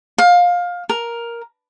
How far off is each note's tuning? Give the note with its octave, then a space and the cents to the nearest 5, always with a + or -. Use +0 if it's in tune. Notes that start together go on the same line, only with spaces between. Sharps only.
F5 +20
A#4 +5